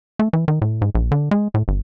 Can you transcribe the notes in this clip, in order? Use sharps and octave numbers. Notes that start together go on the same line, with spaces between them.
A3
E3
D#3
A2
G#2
A#1
D3
G#3
A2
G1